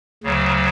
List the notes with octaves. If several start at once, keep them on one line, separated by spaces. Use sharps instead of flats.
D2 C#3 F#3